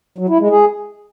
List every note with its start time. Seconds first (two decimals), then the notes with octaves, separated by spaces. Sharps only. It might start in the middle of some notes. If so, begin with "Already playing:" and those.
0.18 F#3
0.29 E4
0.40 G#3
0.50 G#4